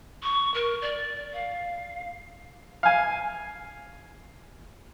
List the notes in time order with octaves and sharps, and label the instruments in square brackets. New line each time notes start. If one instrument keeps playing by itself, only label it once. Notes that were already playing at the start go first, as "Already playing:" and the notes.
[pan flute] C#6
A#4
D5
F5
[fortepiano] F5 G#5